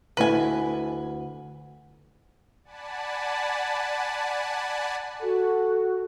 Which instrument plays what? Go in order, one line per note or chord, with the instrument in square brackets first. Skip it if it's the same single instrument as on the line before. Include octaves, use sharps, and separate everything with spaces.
[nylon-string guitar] D2 E4 [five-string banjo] B4 G#5
[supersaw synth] D5 F#5 G#5 A5 B5
[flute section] F#4 [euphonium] A4